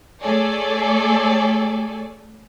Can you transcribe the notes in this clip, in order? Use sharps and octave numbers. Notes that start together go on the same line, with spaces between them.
A3 G#4 A4 C#5 D5 G#5